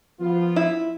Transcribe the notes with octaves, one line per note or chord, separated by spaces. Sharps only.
F3 B3 F4
E4